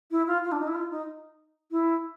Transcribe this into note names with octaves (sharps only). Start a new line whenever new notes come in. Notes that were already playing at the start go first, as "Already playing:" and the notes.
E4
F4
F4
D4
D#4
E4
F4
D#4
E4